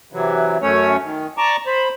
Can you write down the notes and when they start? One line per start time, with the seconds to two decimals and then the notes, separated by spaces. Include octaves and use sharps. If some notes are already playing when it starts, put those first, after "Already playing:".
0.12 C3 E3 F#3
0.62 F#2 A3 C#4 C#5
1.03 D#3
1.38 D5 A5 A#5 C#6 D6
1.66 C5 B5